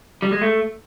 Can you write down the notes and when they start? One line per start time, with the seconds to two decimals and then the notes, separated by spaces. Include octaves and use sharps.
0.22 G3
0.32 G#3
0.42 A3